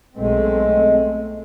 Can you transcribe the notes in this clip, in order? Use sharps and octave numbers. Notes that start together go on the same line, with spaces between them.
B1 G#3 A3 C4